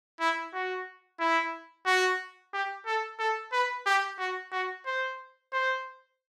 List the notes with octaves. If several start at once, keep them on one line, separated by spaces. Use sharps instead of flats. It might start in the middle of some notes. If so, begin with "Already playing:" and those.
E4
F#4
E4
F#4
G4
A4
A4
B4
G4
F#4
F#4
C5
C5